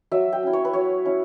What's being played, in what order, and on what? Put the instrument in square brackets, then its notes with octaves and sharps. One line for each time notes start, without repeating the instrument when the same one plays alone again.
[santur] F#3 E5
G5
C#4 E4
C#5
B4
F#3 C#5
C#4 E4